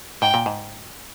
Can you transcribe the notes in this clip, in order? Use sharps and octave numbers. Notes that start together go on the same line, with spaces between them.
G#2 G5
A#2
G#2